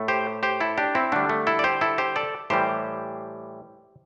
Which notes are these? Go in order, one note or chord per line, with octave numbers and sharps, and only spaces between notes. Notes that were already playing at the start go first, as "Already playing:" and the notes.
Already playing: A2 A3
G4 C5
G4 C5
E4 A4
D4 G4
C4 E4
D3 G3 A3 D4
A3
E4 A4
D5
G4 C5
E4 A4
G4 C5
A4 D5
A2 E3 G3 G4 C5